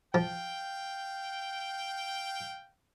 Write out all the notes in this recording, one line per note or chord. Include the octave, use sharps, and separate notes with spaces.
F3 F5 G5